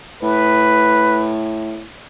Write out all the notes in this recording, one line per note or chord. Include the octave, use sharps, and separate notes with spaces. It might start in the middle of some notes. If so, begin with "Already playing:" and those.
A2 B4